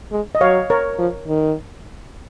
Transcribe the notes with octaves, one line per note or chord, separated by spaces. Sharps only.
G#3
D#5
F#3 C#5 F5
A#4 C#5
F3
D#3